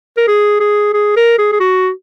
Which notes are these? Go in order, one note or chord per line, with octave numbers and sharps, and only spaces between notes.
A#4
G#4
G#4
G#4
A#4
G#4
G#4
F#4